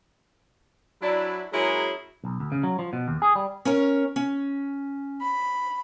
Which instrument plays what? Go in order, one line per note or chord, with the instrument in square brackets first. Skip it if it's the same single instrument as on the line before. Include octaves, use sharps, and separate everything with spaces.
[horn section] F#3 D4 E4
F#3 G#3 C#4 E4 G#4 A#4
[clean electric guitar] B1
D2
C#3
F#3
F3
B2
D#2
G#4
G3
[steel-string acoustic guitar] C#4 A#4 C#5
C#4
[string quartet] B5